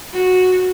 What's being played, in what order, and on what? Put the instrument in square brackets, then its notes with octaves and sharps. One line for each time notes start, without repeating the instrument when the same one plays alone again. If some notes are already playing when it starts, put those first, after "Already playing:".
[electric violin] F#4